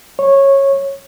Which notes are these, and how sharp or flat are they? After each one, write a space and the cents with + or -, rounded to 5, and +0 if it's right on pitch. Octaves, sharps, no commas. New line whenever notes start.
C#5 -15